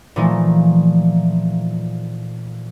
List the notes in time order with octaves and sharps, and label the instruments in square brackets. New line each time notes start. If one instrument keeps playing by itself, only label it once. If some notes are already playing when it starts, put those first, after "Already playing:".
[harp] A#2 E3 F3 A3 D#4